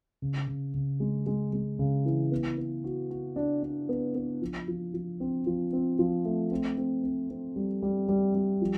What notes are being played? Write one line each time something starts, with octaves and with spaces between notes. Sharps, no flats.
C#3
C#3
C#3
G#3
G#3
G#3
C#3
E3
B3
B3
F#4
F#4
D4
D4
B3
B3
F3
F3
F3
C4
F3
C4
F3
A3
C4
C4
C4
C4
G3
G3
G3
G3
F3